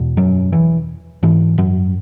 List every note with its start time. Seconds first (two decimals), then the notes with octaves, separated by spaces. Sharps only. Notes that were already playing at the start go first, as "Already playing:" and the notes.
Already playing: E2 B2
0.17 F#2 F#3
0.52 E3
1.23 G#2 E3
1.58 F#2 F#3